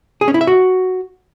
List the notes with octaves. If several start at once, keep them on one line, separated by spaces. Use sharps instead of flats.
G#4
C#4
E4
E5
F#4